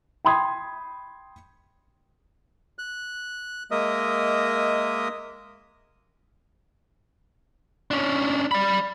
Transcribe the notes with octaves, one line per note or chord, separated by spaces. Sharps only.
G5 B5 C6 D#6 G#6
F#6
G#3 A#3 A#4 D#5 E5 D#6
C#4 D4
D5 B5